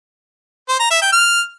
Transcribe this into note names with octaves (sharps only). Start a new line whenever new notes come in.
C5
A#5
E5
G5
F6